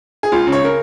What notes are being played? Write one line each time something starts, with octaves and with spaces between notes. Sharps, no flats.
G#4
C#2 F4
C#3
C#5
C#3 A#4